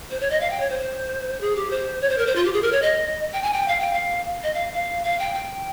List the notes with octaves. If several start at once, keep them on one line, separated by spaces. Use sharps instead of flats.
C5
C#5
D#5
F5
G5
C#5
C5
G#4
G4
C5
C#5
C5
A#4
C5
F4
G4
G#4
A#4
C#5
D#5
G5
G#5
G5
F5
G5
F5
D#5
F5
F5
F5
G5
G5